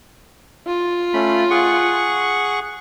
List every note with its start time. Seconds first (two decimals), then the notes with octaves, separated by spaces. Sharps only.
0.67 F4
1.14 A3 C#4 B5
1.51 G#4 F#5 C#6